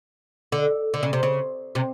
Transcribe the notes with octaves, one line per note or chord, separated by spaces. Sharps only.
D3
D3
C#3
C3
C#3
C3